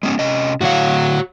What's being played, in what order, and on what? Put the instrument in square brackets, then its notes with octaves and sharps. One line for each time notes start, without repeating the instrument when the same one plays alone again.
[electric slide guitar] G#3 B3 C#4
C3 C#4 D#5
[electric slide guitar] A2 D3 F5 [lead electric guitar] F#4 C#5